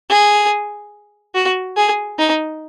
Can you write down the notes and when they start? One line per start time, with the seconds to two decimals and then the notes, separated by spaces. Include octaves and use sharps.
0.10 G#4
1.35 F#4
1.77 G#4
2.18 D#4